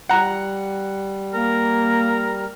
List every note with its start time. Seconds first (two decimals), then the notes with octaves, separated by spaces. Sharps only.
0.09 G3 F#5 A#5
1.34 A#3 A#4